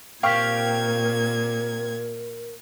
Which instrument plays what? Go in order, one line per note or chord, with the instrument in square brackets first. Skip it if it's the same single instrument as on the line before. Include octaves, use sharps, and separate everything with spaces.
[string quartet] A#2 G#6 [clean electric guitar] C4 G4 [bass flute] A#4 [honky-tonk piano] F5 G5 C#6